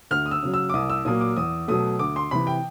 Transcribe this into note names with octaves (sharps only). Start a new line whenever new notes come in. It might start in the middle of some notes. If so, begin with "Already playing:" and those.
D2 F6
D#6
E6
C#3 F#3
E6
D6
C2 D#6
E6
A#2 F#3 A#3 D#6
D6
E2 D#6
B2 F#3 A3 D#6
D2 D6
C6
C3 E3 B5
G5